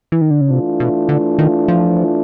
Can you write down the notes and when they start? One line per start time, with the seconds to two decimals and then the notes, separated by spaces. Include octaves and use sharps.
0.12 E3
0.21 D#3
0.31 D3
0.41 C#3
0.49 C3 E3 A3 D4 F4
0.80 B2
1.09 D3
1.39 D#3
1.68 F3